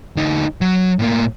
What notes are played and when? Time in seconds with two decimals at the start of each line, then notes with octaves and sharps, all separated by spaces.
0.17 D2 D#4
0.61 F#3
0.99 A2 A#3